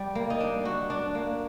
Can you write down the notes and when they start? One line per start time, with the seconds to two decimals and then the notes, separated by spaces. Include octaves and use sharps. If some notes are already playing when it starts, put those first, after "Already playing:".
Already playing: G3
0.15 A#3
0.30 D#4
0.40 D4
0.65 F#4
0.90 D4
1.15 A#3